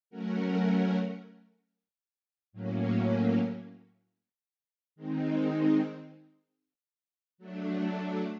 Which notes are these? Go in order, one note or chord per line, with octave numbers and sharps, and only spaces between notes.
F#3 A3 C#4 F#4 A#4
A2 F#3 A#3 C#4
D#3 G#3 C4 D#4
F#3 A3 D4